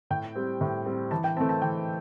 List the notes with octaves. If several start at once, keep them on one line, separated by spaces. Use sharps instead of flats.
A2 G5
G3 C4
A2
G3 C4
E3 A5
G5
A3 C4 A5
A5
E3 G5